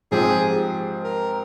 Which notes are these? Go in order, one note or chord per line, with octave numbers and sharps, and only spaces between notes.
G#2 F3 C4 G4 G#4
A#4